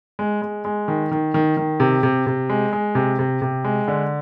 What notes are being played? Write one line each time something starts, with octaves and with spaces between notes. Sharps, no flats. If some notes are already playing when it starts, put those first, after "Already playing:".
G#3
G#3
G#3
D#3
D#3
D#3
D#3
C3
C3
C3
G#3
G#3
C3
C3
C3
G#3
D3